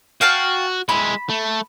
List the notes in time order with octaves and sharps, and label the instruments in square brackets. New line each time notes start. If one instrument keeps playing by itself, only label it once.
[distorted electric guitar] F#4 [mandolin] F5 G5 A5
[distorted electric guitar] G#3 E4 [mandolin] B5
[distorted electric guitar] A3